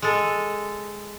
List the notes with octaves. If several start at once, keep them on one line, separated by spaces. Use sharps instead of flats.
G#3 A4